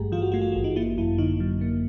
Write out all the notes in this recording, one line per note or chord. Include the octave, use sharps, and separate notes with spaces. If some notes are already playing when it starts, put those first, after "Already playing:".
Already playing: G#1 G2 A3 G4 G#4
E3 F4
F#4
A3 F4
F#4
F4
G#1
D#4
A#3 E4
F#2 E4
D3 D#4
F#3
A#3